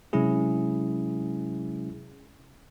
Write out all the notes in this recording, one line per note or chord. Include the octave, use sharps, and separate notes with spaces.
C3 F#3 G#3 C#4 E4 G#4